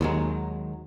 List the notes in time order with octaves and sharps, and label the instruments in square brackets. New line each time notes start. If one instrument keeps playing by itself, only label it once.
[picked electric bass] D#2 [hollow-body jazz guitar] D#3 F#3 G#3